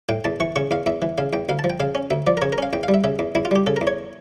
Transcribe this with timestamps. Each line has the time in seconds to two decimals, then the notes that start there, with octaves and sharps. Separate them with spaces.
0.09 A2 G5
0.24 E2 A5
0.40 E3 C#6
0.56 C#3 C#6
0.71 E2 F5
0.86 E2 E5
1.02 E3
1.18 C#3 F5
1.33 E2 G5
1.49 D2 F5
1.59 A5
1.64 F3
1.70 G5
1.80 C#3 F5
1.95 C#4
2.11 D2 E5
2.27 F3 D5
2.37 A#4
2.42 C#3 C#5
2.52 A#4
2.58 C#4 F5
2.73 E2 G5
2.83 F5
2.88 G3
2.94 E5
3.04 C#3 E5
3.19 E2
3.35 E2 E4
3.45 F4
3.51 G3 G4
3.67 C#3 A4
3.76 A#4
3.81 E2
3.87 C#5